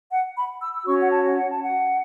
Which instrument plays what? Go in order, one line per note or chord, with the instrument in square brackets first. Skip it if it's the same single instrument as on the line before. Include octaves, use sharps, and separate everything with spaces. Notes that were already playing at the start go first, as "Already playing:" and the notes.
[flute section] F#5
B5
E6
E6
C#4 F#4 C#5 C#6
F#5
A5
F#5
A5
F#5